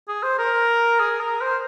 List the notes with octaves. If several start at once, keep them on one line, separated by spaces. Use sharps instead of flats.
G#4
C5
A#4
G#4
A#4
C5